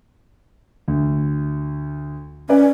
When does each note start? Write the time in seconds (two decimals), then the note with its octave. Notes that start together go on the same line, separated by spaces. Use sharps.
0.88 D2
2.49 C#4 B4 D5 G#5